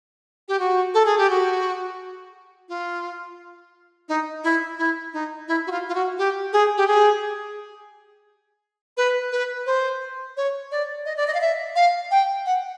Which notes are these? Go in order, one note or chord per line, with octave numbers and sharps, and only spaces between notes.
G4
F#4
A4
G#4
G4
F#4
F4
D#4
E4
E4
D#4
E4
F#4
F4
F4
F#4
G4
G#4
G4
G#4
B4
B4
C5
C#5
D5
D#5
D5
D#5
F5
E5
F5
G5
F#5